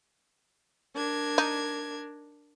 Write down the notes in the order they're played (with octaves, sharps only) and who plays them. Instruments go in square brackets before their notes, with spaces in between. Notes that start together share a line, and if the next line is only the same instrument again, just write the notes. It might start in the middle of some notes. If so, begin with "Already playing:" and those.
[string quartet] D4 A#4 G#6
[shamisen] D#4